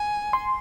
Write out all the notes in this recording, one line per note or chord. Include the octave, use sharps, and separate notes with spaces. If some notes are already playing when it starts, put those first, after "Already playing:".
Already playing: G#5
C6